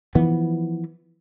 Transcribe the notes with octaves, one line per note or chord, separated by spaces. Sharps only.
E3 F3 B3